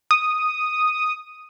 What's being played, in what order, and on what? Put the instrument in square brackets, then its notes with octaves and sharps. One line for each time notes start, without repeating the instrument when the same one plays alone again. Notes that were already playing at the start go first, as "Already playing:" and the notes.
[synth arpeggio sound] D#6